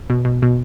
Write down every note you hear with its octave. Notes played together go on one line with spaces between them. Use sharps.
B2
B2
B2